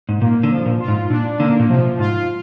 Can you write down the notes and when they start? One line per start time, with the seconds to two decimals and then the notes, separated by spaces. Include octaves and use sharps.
0.09 G#2
0.21 A#2 A#3
0.43 D3
0.51 F3
0.66 A#2
0.80 F4
0.88 G#2
1.10 A#2 D4
1.39 D3 A#3
1.59 A#2
1.70 C3 F3
1.99 G#2 F4